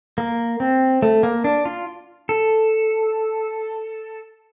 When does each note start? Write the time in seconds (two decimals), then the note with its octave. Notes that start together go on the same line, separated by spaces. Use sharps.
0.18 A#3
0.60 C4
1.02 A3
1.23 A#3
1.44 D4
1.65 F4
2.29 A4